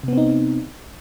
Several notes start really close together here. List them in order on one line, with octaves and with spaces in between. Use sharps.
C3 B3 C4 D#4